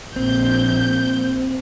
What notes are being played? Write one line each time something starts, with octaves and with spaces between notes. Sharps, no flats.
A#1 C4 G6